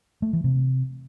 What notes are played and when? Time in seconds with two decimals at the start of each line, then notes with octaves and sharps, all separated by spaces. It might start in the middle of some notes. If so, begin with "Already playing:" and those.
0.22 A3
0.33 E3
0.44 C3